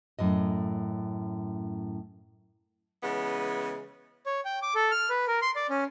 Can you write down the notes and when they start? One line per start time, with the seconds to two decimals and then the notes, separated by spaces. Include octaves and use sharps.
0.19 F#2 A2 D#5
3.03 C#3 E3 G#3 B3
4.26 C#5
4.45 G5
4.62 D6
4.75 A4
4.91 F6
5.10 B4
5.27 A#4
5.42 C6
5.56 D5
5.70 C#4